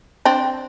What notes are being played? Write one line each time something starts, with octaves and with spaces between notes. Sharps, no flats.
C4 D4